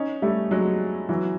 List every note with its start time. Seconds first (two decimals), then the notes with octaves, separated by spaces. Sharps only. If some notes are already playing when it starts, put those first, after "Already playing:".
Already playing: C#4 D#4
0.22 G3 A3
0.51 F#3 G#3
1.09 E3 F#3